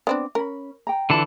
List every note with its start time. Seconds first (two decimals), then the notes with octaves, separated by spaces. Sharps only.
0.07 B3 C4 D4 D5
0.35 C#4 A#4 B5
0.87 G5 A#5
1.10 D3 E3 F4 A5 B5